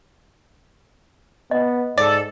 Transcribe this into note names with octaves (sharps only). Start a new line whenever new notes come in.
B3 D#5
G#2 A4 D5